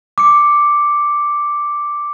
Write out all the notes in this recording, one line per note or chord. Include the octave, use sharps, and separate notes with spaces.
D6 C#7